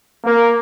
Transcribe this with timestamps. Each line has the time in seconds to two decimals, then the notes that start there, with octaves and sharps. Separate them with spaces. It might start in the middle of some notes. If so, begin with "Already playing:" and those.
0.25 A#3